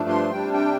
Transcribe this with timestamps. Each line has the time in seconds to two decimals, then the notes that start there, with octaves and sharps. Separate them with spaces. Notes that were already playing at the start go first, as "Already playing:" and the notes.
Already playing: G2 F3 A3 D4
0.09 C6
0.31 C3 G3 D4 G5
0.53 G5